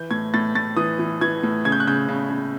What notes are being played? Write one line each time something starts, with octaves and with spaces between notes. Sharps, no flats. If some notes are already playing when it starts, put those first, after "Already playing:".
Already playing: E3 G6
A2 G#6
A2 A6
A2 A6
E3 D#6
E3
E3 G#6
A2
C#3 G#6
G6
F#6
C#3 G6
C#3
C#3